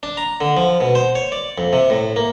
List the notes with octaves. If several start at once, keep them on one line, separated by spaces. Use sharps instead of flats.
D4
A#5
D3
F3
B2
C5
C#5
D5
F2
C3
A2
A#3